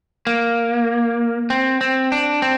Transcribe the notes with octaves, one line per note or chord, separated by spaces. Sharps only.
A#3
C4
C4
D4
C4